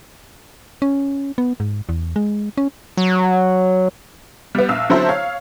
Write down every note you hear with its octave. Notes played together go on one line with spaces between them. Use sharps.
C#4
B3
G#2
E2
G#3
C#4
F#3
G3 B3
A#1 F5 E6
D3 F#3 C4 E4 A4 C5
C#5 F5